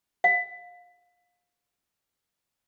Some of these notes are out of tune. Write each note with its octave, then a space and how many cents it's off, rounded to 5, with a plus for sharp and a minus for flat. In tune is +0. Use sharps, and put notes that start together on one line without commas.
F5 +25